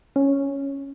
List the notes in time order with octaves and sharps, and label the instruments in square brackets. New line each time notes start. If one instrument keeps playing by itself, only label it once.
[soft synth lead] C#4